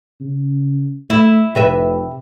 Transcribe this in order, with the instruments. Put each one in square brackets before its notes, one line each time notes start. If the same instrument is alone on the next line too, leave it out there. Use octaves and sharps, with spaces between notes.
[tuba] C#3
[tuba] A3 [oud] E4
[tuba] F1 [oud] C3 B4 E5